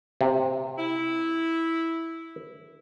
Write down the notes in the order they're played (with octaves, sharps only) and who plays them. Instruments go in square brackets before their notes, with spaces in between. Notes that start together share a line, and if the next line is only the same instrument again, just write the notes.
[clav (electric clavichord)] C3
[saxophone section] E4